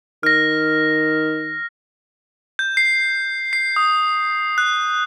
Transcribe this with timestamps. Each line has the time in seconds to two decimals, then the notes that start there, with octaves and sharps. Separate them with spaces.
0.23 D#3 F6 A#6
2.59 G6
2.77 C7
3.53 C7
3.76 D#6
4.58 F#6